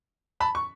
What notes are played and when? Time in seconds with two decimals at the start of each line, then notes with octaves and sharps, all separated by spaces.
0.40 A5 B5
0.55 C#6